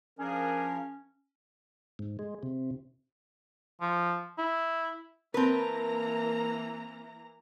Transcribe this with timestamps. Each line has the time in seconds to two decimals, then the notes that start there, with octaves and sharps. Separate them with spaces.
0.19 F3 C#4 D4 G#4 A#4
1.99 G#2
2.19 G#3
2.43 C3
3.81 F3
4.39 E4
5.34 E3 A#3 C4 A#4 B4 A5 A#5